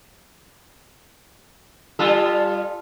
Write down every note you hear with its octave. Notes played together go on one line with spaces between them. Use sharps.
G3 F4 A4